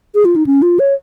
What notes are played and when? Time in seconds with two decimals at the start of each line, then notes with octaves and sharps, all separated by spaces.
0.15 G#4
0.25 F4
0.36 D#4
0.47 C#4
0.62 F4
0.79 C#5